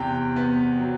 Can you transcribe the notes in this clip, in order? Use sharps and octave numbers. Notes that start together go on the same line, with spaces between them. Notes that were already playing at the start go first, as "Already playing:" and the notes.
Already playing: E2 C3 G5
B3
F#3